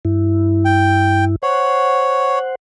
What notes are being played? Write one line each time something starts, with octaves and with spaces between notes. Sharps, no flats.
G2 E4
G5
C5 C#5 F#5